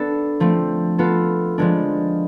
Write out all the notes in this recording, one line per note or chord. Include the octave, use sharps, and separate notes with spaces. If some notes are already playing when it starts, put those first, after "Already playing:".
Already playing: B3 D4 A4
F3 A3 C4
B3 F4 A4
F3 G#3 B3 D4